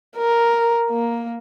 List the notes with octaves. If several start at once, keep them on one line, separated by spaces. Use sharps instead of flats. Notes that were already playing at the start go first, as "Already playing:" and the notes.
A#4
A#3